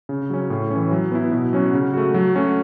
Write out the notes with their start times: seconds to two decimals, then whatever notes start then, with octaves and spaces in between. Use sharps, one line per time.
0.09 C#3
0.30 F#3 C#4
0.50 A2
0.70 C#4
0.75 E3
0.92 F#3
1.12 B3 E4
1.32 B2
1.53 F#3 C#4 F#4
1.74 C#3
1.94 A3 F#4
2.14 F#3
2.35 A3 C#4 F#4